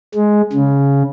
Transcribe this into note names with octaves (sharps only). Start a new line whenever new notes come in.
G#3
C#3